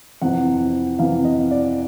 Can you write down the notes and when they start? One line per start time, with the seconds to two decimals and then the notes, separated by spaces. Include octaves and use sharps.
0.22 F2 C3 E3 F#5
0.99 F2 C3 E3 F5
1.25 D#5
1.51 D5